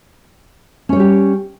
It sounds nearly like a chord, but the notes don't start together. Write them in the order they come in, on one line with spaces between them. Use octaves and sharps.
C#4 C#5 G3 G4